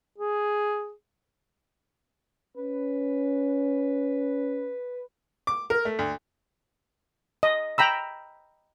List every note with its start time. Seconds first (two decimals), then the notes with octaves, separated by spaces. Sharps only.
0.19 G#4
2.57 C#4 B4
5.47 D6
5.70 A#4
5.85 A3
5.99 D2
7.43 D#5
7.78 G5 A#5 B5 E6